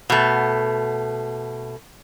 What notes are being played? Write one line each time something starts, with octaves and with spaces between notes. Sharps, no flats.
B2 A3